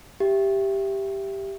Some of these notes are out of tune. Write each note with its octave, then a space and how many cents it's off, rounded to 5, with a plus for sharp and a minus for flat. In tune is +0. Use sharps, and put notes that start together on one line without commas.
G4 +0 E5 +20